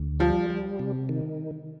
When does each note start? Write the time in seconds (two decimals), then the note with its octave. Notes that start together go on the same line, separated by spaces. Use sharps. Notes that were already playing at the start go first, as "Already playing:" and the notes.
Already playing: D2
0.20 F3 G3
0.50 G3
0.79 C3
1.09 D#3